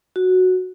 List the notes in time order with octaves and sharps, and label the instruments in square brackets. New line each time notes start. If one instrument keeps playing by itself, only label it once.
[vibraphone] F#4